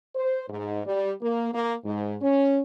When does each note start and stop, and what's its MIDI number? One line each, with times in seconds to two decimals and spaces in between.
0.15 0.43 72
0.49 0.81 44
0.86 1.13 55
1.22 1.48 58
1.53 1.75 58
1.85 2.16 44
2.21 2.60 61